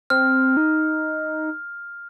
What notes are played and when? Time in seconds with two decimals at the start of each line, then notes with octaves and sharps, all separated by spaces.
0.10 C4 F6
0.57 D#4